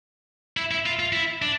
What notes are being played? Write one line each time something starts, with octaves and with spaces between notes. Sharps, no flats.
E4
E4
F4
F4
E4
D4